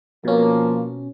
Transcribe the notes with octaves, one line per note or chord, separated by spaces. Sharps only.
B2 F3 A#3 C#4